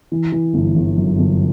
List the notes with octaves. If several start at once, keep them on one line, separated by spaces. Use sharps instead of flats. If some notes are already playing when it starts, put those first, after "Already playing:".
E3
E3
G1
G1
F#2
G1